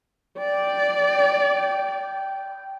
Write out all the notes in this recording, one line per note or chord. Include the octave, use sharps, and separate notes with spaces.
D5 G5